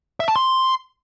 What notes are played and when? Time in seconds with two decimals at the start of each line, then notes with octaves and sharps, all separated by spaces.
0.20 E5
0.28 A5
0.36 C6